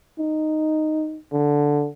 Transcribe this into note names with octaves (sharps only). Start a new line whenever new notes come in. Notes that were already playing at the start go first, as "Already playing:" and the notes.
D#4
D3